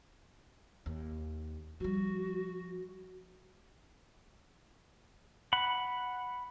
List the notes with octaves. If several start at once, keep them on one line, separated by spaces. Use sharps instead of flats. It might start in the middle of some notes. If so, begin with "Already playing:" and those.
D#2
F3 G3 F#4
F#5 B5